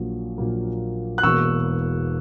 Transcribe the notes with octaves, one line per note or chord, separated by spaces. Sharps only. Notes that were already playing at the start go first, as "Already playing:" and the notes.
Already playing: A#1 A#2 F#3 A#3
A#1 A#2 F#3 A#3
F#6
E1 E2 B2 A#3 C#6 E6